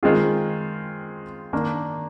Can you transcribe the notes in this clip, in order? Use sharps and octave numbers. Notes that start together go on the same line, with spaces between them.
D#3 G#3 C4 F4 G#4
D#3 A#3 D4